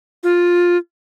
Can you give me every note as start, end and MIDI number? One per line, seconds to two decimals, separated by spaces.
0.23 0.77 65